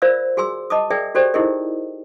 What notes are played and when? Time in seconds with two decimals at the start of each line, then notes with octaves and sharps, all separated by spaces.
0.02 F4 A#4 C5 D5 F5 E6
0.37 F#4 G#4 G#5 C6 E6
0.70 D#5 A5 D6 D#6
0.90 G#4 A#4 D5 E5 G5 G#5
1.15 F#4 G4 A4 C5 D5 G5
1.34 D#4 E4 G4 G#4 A#4 D#5